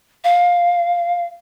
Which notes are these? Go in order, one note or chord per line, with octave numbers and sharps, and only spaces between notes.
F5